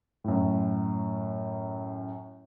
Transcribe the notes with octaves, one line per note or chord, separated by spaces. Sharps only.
F#2 A2